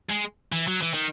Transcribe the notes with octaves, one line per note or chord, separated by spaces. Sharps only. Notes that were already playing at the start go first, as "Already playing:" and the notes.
G#3
E3
F#3
E3
D#3